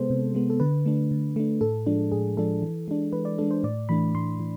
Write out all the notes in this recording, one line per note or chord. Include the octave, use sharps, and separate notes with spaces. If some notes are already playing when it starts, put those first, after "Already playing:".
Already playing: C3 G#3 B3 A4 C5
C3
G#3 B3
A4
D3 B4
A3 D4
D3
A3 D4
A2 A4
F3 G#3 D4
A2 G#4
F3 G#3 D4 A4
E3
G#3 D4
E3 B4
D5
G#3 D4 A4
C5
A2 D5
E3 A3 D4 B5
A2 C6
E3